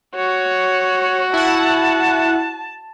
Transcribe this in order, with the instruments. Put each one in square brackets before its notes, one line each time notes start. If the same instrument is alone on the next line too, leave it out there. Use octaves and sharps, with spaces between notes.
[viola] F#4 [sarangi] C#5
[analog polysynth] E4 F#5 [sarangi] A5